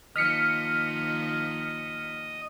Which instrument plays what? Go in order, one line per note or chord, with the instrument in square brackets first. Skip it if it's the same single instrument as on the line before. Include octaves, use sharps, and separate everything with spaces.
[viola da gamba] D#3 F3 A#3 [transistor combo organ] D#5 [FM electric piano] F6 B6 C#7